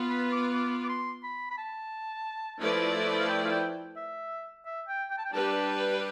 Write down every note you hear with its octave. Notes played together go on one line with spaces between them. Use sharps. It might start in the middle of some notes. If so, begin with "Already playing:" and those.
Already playing: B3 F4 B4
B5
D6
D6
D6
C6
B5
B5
A5
F3 A3 E4 B4 D5
F5
G5
F5
G5
E5
E5
G5
G5
A5
G5
G3 D4 G4 B4 A5